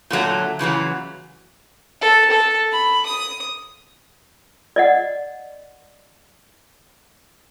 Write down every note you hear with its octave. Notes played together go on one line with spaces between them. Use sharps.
A#2 D3 F#3 A3
A#2 C#3 E3 F#3
A4
A4
B5
D#6
D5 D#5 F#5